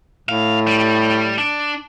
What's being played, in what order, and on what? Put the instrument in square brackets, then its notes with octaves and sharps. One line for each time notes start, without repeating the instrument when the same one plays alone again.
[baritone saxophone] A2 [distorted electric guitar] F5
[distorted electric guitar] G3
D4